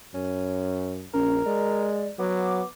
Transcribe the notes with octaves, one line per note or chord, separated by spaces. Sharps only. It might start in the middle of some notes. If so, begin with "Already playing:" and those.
F#2 C#4
A#1 C#4 A#4
G#3 D5
F#3 B3 D6